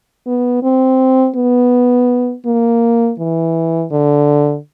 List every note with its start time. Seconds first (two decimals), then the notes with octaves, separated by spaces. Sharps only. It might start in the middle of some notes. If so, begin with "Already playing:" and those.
0.27 B3
0.63 C4
1.36 B3
2.46 A#3
3.19 E3
3.91 D3